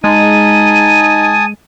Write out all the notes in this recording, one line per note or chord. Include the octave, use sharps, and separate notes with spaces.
G#3 D#4 G#5 A5 D#6 D#7